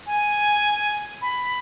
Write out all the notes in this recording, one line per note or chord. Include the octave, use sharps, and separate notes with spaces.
G#5
B5